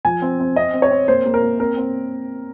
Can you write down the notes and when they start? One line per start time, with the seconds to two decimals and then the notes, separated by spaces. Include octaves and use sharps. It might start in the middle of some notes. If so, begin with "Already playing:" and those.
0.05 F3 G#5
0.22 C4
0.39 C4
0.56 C4 D#5
0.74 C4
0.82 C#5
0.91 C4
1.08 A#3 C5
1.26 A#3
1.34 A#4
1.42 A#3
1.59 C4 A#4
1.77 C4